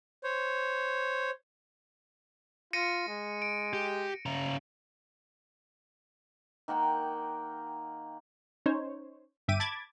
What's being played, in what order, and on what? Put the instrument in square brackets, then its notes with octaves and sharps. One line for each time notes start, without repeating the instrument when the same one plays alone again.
[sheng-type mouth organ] C5 C#5
[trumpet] F4 [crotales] A#6 C#7 D#7
[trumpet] G#3
[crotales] D7
[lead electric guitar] G4
C#3 A#5
[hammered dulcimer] D#3 A#3 F#5 G5
[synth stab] C#4 D#4 C5 C#5
G1 G2 E5 G5 D6 D#7
A5 B5 D6 G#6 A6